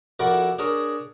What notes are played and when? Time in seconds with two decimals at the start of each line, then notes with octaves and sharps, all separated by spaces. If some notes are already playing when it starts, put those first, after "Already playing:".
0.19 F2 E4 F#4 A4 A#4 D5
0.59 D4 G#4 A#4 C#5